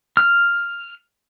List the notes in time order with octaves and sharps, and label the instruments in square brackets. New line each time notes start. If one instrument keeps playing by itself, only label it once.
[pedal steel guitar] F6